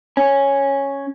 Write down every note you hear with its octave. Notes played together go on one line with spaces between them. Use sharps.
C#4